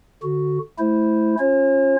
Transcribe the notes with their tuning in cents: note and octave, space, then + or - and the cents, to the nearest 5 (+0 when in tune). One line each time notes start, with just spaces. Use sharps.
D3 +0 F#4 +5
A3 -20 E4 -5 C5 +0
C#4 -10 F4 +0 C#5 -45